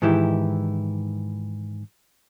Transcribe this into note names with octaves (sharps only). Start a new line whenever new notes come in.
G#2 D#3 E3 E4 G4